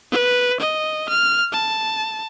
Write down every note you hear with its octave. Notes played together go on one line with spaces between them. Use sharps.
B4
D#5
F6
A5